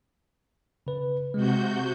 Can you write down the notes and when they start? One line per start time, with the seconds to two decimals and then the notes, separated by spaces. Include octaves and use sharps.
0.87 C#3 B4
1.34 C3 G#3 F#4 G6